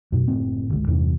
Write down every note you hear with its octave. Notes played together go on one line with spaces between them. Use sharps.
F#2 B2
F#1 A2 C4
G1 C#2
E2 G2 C3 E3